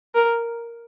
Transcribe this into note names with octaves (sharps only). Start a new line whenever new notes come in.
A#4